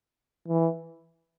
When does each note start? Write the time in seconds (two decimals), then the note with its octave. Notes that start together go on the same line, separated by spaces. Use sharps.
0.48 E3